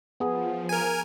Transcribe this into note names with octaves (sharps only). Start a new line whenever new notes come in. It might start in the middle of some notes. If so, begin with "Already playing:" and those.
F3 B3 G#4
A#4 G#5